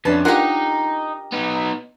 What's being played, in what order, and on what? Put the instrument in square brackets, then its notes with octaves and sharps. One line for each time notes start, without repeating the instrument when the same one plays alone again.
[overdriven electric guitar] F2 [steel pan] C#4 D4 B4 [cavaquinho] A5
[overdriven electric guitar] D#4 [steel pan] F4 F#5 C6 [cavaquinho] G4 A#4
[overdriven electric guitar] B3 D#4